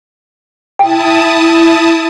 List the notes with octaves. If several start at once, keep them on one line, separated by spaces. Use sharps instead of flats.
E4 G5 A5 D#6